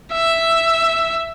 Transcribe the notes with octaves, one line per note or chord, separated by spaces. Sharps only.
E5